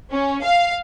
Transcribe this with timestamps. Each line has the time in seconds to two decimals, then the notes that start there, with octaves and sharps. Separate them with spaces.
0.11 C#4
0.43 F5